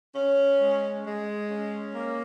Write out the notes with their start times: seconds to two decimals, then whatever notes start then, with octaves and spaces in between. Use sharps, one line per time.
0.16 C#4
0.61 G#3
1.05 G#3
1.50 C#4
1.95 A#3